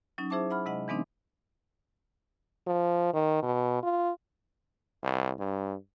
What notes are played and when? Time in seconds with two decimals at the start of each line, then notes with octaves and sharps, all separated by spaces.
0.18 F#3 C#4 D#4
0.30 E4 G#4 C5 E5 A5 D6
0.50 E5 F#5 B5 F6
0.66 C3 G#3 D#5 F#5
0.88 E3 G#3 B3 C4 D4 D#4
2.67 F3
3.14 D#3
3.43 B2
3.83 F4
5.03 C2
5.39 G2